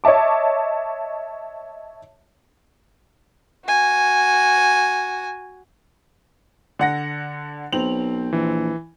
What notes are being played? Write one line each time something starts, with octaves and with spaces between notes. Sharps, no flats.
C#5 D#5 E5 A5 D6
F#4 G#5
D3 F#5 A#6
B1 C4 F7 F#7
A#1 E3